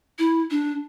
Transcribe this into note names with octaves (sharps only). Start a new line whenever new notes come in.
E4
D4